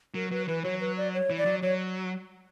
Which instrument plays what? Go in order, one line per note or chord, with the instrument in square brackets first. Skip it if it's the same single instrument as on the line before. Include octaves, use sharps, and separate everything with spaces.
[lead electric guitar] F#3 [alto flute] A#4
[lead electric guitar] F#3 [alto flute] B4
[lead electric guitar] E3 [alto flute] B4
[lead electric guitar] F#3 [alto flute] C#5
[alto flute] B4
D5
C#5
[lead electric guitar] E3
[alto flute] D5
[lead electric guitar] F#3
[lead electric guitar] F#3 [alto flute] C#5